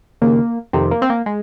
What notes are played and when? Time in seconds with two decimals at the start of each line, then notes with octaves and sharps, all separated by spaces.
0.22 D#2 C#3 A#3
0.73 F2 C3 D#3 C4
0.91 A#3
1.02 C4
1.10 A#3
1.26 G#3